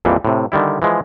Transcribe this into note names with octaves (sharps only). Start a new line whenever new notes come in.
A#1 F2 A#2 E3 G3
A2 C3
D3 D#3 G3 E4
E3 F3 G#3